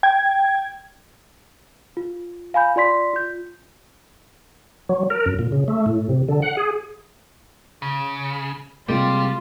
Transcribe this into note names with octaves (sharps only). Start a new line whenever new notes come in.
G5 G#6
F4
F5 G#5 B5 G6
F4 D5 C6 B6
F4 G6
F#3
A#4
F#2
A#2
C#3
A3
A2
C3
D3
F#5
G#4
C#3
C3 G3 G#3 A#3 F4